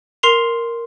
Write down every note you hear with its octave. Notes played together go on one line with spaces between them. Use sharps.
A#4 C6 C7 F7